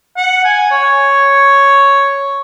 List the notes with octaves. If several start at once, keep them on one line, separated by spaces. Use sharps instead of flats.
F#5
G#5
C#5